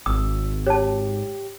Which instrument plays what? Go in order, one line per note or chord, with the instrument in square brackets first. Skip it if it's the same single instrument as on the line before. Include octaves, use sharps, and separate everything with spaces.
[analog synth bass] G#1 [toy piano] D#6 [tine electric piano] E6
[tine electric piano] G4 [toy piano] C#5 A5